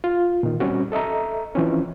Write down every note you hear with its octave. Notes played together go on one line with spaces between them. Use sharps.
F4
A#2 D#3
G3 C4 C#4 F#4
A4 D#5 E5 A#5
E3 F3 C4 C#4